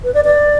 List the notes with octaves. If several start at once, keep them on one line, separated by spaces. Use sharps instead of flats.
B4
D5
D5